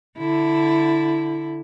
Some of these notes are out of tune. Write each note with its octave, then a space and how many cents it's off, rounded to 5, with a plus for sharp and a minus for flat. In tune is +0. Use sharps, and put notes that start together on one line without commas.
D3 +0 E4 +0